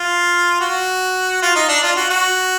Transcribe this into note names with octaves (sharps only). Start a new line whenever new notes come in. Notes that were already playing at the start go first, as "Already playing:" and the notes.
Already playing: F4
F#4
F4
D#4
D4
F4
F#4
F#4